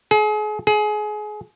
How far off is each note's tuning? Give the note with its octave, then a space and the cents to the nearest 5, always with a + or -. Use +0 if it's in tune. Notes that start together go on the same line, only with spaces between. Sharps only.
G#4 +35
G#4 +25